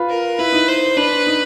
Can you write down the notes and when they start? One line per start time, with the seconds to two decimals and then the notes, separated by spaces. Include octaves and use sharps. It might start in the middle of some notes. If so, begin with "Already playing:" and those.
Already playing: F4 B4
0.09 A#4
0.39 E4 B4
0.52 D#4
0.68 C5
0.96 D4 B4
1.27 D#4